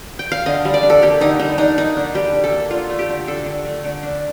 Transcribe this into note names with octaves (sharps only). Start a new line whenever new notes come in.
G5
F5
D3 D#5
G3
D5
D4
A4
A#3 G4
D3 D#4
G3 D#4
D4 D#4
A#3 D#4
D3 D4
G3 G4
D4
A4
A#3
D3 F4
A3
G4
D3
D4 A4
D3
A3
D3
D4